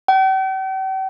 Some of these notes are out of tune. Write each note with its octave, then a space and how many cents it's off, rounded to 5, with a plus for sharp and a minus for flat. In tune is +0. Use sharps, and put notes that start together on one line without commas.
G5 -45